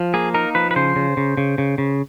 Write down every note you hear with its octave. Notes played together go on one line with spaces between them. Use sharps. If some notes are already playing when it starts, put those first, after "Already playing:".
Already playing: F3
A#3 G#4
D#4 A#4
F3 B4
B4
C#3 C5
C#3
C#3
C#3
C#3
C#3